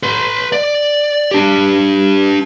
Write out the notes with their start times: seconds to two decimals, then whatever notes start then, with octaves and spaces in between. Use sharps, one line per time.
0.03 B4 C6
0.52 D5
1.31 D4 G4